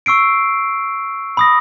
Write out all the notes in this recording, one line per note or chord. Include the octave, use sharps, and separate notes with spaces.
C#6 E6 C7 D7
B5 D#6 A#6